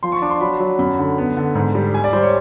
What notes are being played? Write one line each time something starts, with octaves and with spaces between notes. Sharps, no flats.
F3 C6
C#6
D4 D6
C6
F#3 B5
F#3
F#2 B5
D3
B3
D3
G#2
G3
G3 G#5
D5
G3 C5
C#5